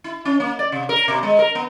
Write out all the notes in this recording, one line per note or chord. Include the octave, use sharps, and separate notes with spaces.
E4
C#4
A#3
D5
C3
A#4
B2
G#3
A#4
B3